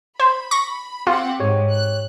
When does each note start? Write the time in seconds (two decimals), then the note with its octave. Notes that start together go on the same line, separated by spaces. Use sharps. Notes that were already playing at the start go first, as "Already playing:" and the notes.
0.20 C5 B5
0.51 C#6 A#6
1.07 C4 F4 G4 F#5
1.40 G#2 G4 C#5
1.71 F#6